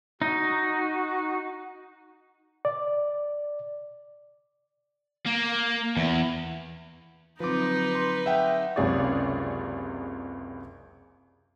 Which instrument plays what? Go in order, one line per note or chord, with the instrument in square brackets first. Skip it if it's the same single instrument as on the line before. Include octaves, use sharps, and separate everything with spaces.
[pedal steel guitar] D#4 [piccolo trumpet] F#4
[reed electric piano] D5
[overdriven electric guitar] A#3
E2
[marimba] D3 F#3 C4 [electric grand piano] F3 D6 [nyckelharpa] D#4 [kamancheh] B4
[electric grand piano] C6
[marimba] G#4 [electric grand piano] E5 F#5 G5
[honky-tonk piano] F#1 C#2 C3 G#4 C#5 D5